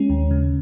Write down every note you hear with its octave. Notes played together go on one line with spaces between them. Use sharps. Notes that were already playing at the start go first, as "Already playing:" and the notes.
Already playing: G#3 C#4
D#2
C#3